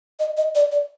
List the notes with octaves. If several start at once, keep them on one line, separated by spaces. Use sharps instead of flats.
D#5
D#5
D5
D5